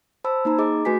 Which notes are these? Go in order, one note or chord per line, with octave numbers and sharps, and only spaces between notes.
C5 A5 B5 E6
A#3 D#4 A#5
G#4 D#5 D6
A3 F#4 B4 G#5 B6